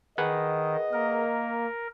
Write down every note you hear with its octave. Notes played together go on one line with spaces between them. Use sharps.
D#3 G#4 B4 D#5 F#5
A#3 A#4